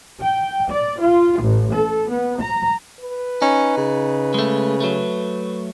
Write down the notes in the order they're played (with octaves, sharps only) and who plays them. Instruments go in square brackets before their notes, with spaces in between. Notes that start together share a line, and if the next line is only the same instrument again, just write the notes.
[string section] G5
D5
F4
A1
A4
B3
A#5
[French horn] B4
[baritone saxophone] C#4 [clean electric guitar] D#4
[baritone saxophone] C#3
[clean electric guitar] G#3 A3
F#3 A3